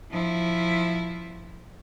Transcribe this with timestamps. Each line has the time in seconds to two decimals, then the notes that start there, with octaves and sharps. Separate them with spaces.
0.12 F3 E4